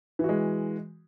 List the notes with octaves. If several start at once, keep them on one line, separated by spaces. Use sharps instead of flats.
E3 G#3 F#4